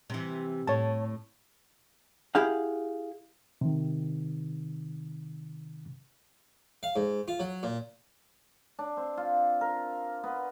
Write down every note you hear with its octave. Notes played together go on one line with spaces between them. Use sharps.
C3 E3
A2 C#5 A5
E4 G4 G#4 F5 F#5
C3 D#3
F5
G#2
F4
F#3
A#2
D4
C4
F4
A#4
B3